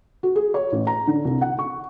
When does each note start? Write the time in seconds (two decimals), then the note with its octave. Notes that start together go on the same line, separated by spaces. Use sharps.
0.23 F#4
0.36 G#4
0.54 C#5
0.72 A1
0.87 A#5
1.07 D3
1.25 C2
1.41 F#5
1.59 C#6